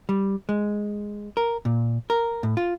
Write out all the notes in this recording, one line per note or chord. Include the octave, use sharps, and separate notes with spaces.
G3
G#3
A#4
A#2
A#4
A2
F4